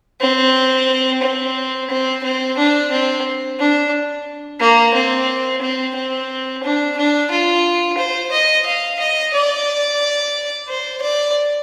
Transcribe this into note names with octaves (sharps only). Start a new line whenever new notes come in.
C4
C4
C4
C4
D4
C4
D4
A#3
C4
C4
C4
D4
D4
F4
C5
D#5
F5
D#5
D5
C5
D5